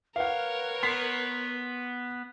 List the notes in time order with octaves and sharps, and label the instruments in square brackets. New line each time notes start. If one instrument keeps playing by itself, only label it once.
[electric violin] A#4 C#5 [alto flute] B4 [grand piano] F5 F#5
[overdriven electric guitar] B3 [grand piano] C6 B6 C7